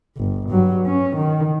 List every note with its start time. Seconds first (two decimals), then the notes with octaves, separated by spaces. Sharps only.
0.17 G1
0.50 G2 F#3
0.86 C#4
1.17 D#3